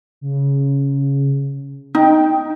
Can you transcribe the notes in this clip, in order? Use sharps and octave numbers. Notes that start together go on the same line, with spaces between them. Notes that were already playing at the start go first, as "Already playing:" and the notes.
C#3
D#4 G5